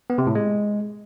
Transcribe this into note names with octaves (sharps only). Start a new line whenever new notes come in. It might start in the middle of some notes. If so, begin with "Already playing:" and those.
B3
C3
A2
G#3